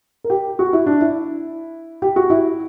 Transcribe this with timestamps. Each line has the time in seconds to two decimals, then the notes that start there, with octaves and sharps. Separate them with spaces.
0.24 A#4
0.30 G4
0.59 F#4
0.73 E4
0.86 D4
1.01 E4
2.02 G4
2.16 F#4
2.30 E4